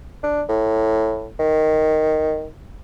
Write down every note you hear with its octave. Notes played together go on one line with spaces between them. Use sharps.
D4
A2
D#3